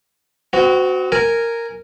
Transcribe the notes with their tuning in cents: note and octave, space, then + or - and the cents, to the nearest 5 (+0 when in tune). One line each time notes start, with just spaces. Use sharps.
C4 -35 F#4 +0
A#4 -10 G#5 +0